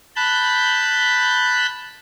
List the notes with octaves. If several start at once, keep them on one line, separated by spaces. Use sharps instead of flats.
A5 B5 F#6 G6